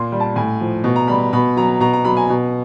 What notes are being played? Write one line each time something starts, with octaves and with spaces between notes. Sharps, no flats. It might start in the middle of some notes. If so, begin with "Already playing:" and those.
Already playing: A#2 C6
G3
A5
A2 G#5
F3
B2
A#5
G3 B5
B2 B5
F#3 A#5
B2 A#5
A#5
F#3 B5
G#5
B2